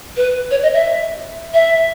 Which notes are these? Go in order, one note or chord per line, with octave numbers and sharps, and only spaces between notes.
B4
C#5
D#5
E5
E5